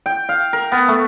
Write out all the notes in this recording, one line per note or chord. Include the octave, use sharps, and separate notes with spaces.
G5
F5
A#4
B3
A3